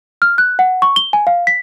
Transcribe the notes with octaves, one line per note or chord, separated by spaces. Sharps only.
F6
F#6
F#5
C#6
G7
G#5
F5
B6